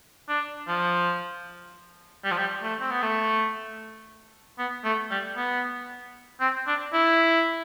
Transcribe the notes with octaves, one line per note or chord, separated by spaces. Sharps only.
D4
F3
G3
F3
G3
A3
C4
B3
A3
B3
A3
G3
B3
C4
D4
E4